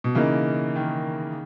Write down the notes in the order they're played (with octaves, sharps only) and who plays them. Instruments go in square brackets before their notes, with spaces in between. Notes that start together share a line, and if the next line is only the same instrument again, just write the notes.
[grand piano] B2
[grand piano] C#3 [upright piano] E3 A#3 D#4
[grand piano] D#3